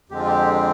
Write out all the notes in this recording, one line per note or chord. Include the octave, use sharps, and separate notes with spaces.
F2 D3 G#3 C4 G4
F4
G4